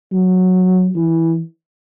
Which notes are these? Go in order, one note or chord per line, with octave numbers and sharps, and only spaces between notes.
F#3
E3